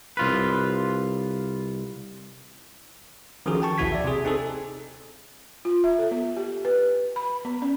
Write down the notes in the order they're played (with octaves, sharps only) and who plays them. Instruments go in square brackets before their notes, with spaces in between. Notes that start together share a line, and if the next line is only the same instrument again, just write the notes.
[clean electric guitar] C2 F4 B4
[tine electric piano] D#3 F3 C#4 F#4 G#4 A4
G5 A5 C#6
A#1 D#2 E4 F#4 G#6 B6
D5 E5
C3 G#4
C4 D#4 G#4 A4
[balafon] F4
E5
A4
B3
G4
B4
B5
B3
C#4